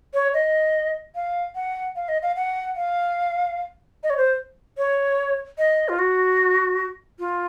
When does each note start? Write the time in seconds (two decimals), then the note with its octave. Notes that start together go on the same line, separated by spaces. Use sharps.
0.14 C#5
0.34 D#5
1.15 F5
1.55 F#5
1.96 F5
2.08 D#5
2.22 F5
2.36 F#5
2.76 F5
4.03 D#5
4.10 C#5
4.17 C5
4.78 C#5
5.58 D#5
5.89 F4
5.99 F#4
7.19 F4